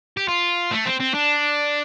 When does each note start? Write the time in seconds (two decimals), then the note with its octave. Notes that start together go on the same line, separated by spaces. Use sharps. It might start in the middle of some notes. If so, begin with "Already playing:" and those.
0.17 G4
0.28 F4
0.71 A3
0.85 C4
1.00 C4
1.14 D4